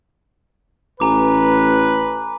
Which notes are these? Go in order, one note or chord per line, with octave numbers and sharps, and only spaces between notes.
A1 B4 G#5 A#5 D6